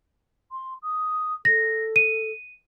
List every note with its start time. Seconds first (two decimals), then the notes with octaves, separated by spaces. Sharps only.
0.51 C6
0.82 D#6
1.45 A4 A#6
1.96 D#7